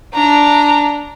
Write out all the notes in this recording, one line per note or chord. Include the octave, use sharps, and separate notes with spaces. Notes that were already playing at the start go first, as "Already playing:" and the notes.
D4 A#5